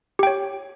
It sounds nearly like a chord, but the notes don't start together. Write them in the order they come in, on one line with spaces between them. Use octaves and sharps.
G4 G5 C#5